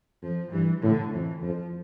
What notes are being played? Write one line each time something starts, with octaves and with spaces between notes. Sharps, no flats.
F2 F3
G2 E3
A2 D3
F2 E3
F2 F3